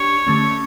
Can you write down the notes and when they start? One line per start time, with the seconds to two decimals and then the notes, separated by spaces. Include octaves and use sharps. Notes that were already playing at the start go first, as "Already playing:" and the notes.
Already playing: D4 G4 C#5
0.27 D3 A3 C#4